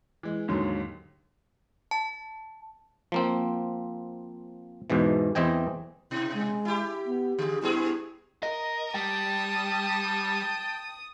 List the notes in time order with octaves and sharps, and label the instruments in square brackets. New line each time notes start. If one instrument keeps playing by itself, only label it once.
[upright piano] E3 G#3
D#2 G#2 D3 F#3
[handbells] A5
[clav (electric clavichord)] F3 A#3 C4
E2 G#2 B2 E3
E2 E3 C4 D#5 G5 G#5
[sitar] B2 [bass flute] E4
[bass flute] G#3
[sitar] E4 G4
[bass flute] B3
[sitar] D3 [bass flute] G#4
[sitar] G2 B3 G#4 [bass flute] E4
[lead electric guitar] A#4 [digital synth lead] D#5
[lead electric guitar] G3 [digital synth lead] G5 [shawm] A5 [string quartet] D#6